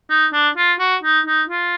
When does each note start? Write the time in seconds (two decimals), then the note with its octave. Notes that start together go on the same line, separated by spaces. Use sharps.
0.10 D#4
0.33 D4
0.57 F4
0.80 F#4
1.03 D#4
1.26 D#4
1.49 F4